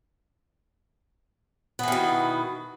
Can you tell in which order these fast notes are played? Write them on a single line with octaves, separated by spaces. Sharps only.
B3 E3 D#3 B2